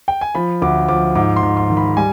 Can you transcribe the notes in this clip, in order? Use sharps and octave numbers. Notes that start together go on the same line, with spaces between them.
G5
G#5
F3 B5
D2 D6
F3 D6
G#2 D6
C6
G#2
C6
D#3
B5
G3 G#5